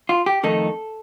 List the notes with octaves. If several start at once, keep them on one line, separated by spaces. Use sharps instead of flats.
F4
G4
F2 D#3 A3 D#4 A4